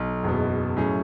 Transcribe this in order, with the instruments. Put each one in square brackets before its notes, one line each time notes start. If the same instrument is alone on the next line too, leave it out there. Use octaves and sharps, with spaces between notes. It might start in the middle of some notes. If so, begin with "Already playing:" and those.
Already playing: [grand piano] B1
F#1 E2 B2
A2 F#3 C#4 G#4